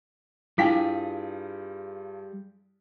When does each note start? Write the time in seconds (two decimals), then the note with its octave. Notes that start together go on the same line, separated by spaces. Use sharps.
0.58 G2 G3 E4 F4 G#4 G5 G#5 B6